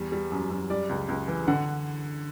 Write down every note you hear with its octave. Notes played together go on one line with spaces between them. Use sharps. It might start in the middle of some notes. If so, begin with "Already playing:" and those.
Already playing: E2 G3
G3
F#2
F#2
G3 D5
C#2
C#2
E3
D3 F#5